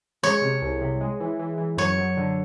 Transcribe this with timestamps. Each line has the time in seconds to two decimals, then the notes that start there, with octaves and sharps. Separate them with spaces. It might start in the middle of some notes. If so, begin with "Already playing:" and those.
0.23 G#3 C#5
0.42 C3
0.62 C2
0.81 C3
1.01 G#3
1.20 E3
1.39 E3
1.58 E3
1.77 F#2 C#5
1.98 F#3
2.17 D3